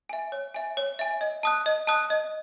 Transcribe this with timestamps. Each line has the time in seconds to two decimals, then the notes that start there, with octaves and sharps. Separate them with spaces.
0.09 E5 G#5
0.32 C#5
0.54 E5 G#5
0.77 C#5
0.99 E5 G#5
1.21 D#5
1.43 A5 D#6 F#6
1.66 D#5
1.87 A5 D#6 F#6
2.10 D#5